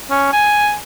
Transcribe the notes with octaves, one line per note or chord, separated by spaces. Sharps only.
C#4
G#5